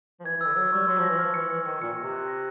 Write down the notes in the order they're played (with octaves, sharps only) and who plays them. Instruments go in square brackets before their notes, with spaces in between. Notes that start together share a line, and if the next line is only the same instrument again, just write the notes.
[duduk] F3
[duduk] E3 [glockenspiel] G#6
[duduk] E3
[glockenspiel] E6
[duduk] D3
[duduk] F#3 [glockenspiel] E6
[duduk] G3 [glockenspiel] C#6
[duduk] F#3 [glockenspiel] C6
[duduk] F3
[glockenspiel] A#6
[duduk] E3
[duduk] F3 [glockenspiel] F6
[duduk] E3 [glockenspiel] C#7
[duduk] E3 [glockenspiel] C#7
[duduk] D#3 [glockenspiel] C#7
[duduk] A#2 [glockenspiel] C#7
[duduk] C3 [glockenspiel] F6
[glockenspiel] F#6
A#6